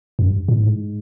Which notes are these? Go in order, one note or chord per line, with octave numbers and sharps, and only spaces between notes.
F#2
G2
A2
G#2